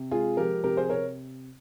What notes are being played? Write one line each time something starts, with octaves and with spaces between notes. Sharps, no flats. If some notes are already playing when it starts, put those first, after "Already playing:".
Already playing: C3
G#3 F4 G#4
F3 G4 A#4
C3 G4 A#4
G#4 C5
C3 A#4 C#5